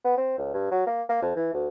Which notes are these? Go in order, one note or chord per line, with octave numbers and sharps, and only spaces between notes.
B3
C4
C#2
G2
F#3
A#3
A#3
F2
E3
D2